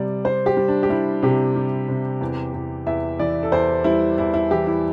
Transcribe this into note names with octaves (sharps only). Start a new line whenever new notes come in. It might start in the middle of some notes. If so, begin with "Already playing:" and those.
Already playing: C3 G3 D5
G3 C5
G4
G3
D4
G4
G3 E4
C3 G4
G3
C3
E2
E2
E2 E5
E3 D5
A4
E2 C5
G3 E4
E2 E4
E4
E3 G4
E4